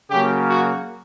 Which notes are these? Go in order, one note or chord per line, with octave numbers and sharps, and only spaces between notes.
C#3 F#3 A#3 G4
F#4